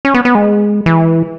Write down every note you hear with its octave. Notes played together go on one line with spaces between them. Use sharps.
C#4
B3
B3
G#3
E3